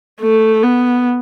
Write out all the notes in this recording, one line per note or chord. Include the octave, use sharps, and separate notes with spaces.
A3
B3